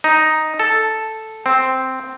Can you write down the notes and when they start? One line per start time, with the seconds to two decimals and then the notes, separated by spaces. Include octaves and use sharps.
0.04 D#4
0.60 A4
1.46 C4